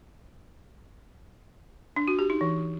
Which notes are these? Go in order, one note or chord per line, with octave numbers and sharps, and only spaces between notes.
D4
F#4
G4
D#4
E3